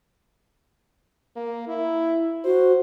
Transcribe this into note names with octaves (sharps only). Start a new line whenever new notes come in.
A#3
E4
F#4 C5